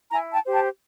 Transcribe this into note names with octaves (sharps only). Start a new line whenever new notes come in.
E4 G#5 A#5
G5 A5
G4 C5
G5 A5